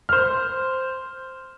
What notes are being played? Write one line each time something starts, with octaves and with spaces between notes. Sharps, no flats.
C5 F6